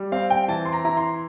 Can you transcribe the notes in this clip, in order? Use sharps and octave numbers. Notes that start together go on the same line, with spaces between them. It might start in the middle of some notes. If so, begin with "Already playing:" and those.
Already playing: G3
C4 F5
G5
E3 A5
C6
A#5
E4 A#5
C6